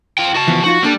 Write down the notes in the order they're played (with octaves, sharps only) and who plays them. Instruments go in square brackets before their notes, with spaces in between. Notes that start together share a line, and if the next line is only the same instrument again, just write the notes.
[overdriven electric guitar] F4 G5
F#4 A5
[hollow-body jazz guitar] E3 F3 B3
[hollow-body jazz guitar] F3 D#4 F4 [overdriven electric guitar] F#4
[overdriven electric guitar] G3 [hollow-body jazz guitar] A#3 D4 A4